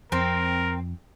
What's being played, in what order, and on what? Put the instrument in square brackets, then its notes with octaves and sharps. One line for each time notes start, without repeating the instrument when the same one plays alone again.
[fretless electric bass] F2 [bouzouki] C4 [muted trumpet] A#4